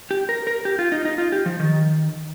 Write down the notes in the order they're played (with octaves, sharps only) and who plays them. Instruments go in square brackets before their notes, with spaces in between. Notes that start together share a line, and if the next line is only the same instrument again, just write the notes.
[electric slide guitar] G4
A#4
A#4
G4
F4
D#4
D#4
F4
G4
F3
D#3